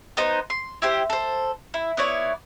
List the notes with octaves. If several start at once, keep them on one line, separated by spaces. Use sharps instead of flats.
B3 D#4 C5
C6
E4 G4 C5
A4 C5
E4
B3 E4 C#5 D5